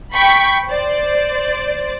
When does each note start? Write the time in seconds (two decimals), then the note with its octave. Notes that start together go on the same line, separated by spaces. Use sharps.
0.13 G5 B5 C#6 B6
0.68 C5 D5